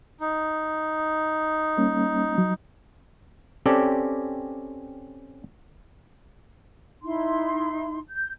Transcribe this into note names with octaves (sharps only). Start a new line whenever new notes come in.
D#4
G3 A#3 C#4
F#3
C4 C#4 G4 A4 D5
D#4 E4 C6
G6